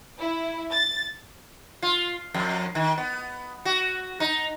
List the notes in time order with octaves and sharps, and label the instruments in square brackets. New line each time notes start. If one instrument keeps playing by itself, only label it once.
[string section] E4
A6
[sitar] F4
F2
D#3
B3
F#4
D#4